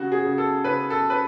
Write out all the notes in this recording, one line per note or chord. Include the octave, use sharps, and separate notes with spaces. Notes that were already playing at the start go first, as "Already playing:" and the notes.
Already playing: C#3 F#4
G#4
C#3
A4
C#3 B4
A4
B4